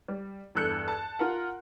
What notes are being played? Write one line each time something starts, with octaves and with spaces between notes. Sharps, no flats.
G3
E2 G2 A4 F#6 G6 C#7
A5
F4 A#4 F#5